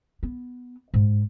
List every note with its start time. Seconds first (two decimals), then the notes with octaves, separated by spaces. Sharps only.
0.23 B3
0.94 G#2